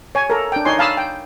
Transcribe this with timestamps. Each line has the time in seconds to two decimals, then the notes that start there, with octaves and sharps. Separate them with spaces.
0.15 C#5 G#5
0.30 A4 A#4
0.52 D4 G5
0.65 D#4 C#5 G#5 C6
0.79 F5 A5 B5 D#6 E6
0.97 G5